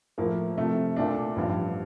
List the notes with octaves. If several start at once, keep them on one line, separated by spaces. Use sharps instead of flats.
A2 F3 A#3
C3 F3 A3
A#2 A3 D4
A1 G2 F3